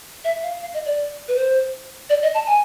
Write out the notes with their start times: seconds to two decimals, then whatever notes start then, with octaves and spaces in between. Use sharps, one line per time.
0.24 E5
0.43 F5
0.61 F5
0.74 D#5
0.86 D5
1.28 B4
1.36 C5
2.10 D5
2.22 D#5
2.34 A5
2.47 G#5